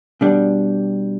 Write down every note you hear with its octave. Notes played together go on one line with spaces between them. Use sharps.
B2 G3 D4